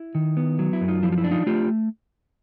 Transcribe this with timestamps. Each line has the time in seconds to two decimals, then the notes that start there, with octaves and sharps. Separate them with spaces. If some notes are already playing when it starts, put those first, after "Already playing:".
Already playing: E4
0.15 D#3
0.37 B3
0.59 F#3
0.73 E4
0.81 F#2
0.88 D#4 F4
1.03 F3 E4
1.12 F4
1.18 E4
1.24 D4
1.31 D#4 F4
1.46 A3 F4 G4